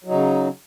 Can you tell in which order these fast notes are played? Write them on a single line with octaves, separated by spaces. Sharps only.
F#3 D#4 C#3